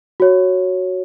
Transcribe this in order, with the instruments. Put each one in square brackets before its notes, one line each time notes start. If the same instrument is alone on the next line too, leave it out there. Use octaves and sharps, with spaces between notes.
[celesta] F#4 C#5